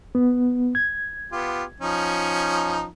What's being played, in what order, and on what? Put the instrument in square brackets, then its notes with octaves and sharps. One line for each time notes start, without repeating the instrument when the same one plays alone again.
[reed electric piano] B3
G#6
[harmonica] B3 F4 G4
F3 C#4 D#4